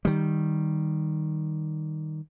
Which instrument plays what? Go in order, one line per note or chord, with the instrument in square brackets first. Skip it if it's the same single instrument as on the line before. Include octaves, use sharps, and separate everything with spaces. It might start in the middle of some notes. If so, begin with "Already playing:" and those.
[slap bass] D#3 G3